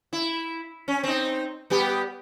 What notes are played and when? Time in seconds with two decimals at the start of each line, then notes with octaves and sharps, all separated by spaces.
0.13 E4
0.88 C#4
1.03 C4 D#4
1.70 G3 B3 G4